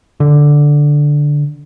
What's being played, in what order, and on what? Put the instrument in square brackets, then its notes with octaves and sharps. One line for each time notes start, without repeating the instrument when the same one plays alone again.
[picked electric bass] D3